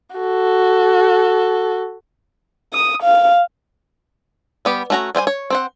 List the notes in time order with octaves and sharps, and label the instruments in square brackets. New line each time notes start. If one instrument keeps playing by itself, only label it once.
[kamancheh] F#4 A4
D#6
F5
[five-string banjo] G3 B3 G4
A3 C#4 F#4 A#4 A#5
G3 C5 G5 G#5
C#5
C4 C5 F#5